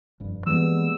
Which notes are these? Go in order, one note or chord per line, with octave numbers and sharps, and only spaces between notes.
F1 G2
E3 G3 G#3 A#3 B3 E6